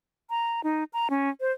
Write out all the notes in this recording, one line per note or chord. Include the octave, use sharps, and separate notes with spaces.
A#5
D#4
A#5
C#4
C5